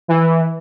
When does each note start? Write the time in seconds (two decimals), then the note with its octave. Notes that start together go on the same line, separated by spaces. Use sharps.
0.08 E3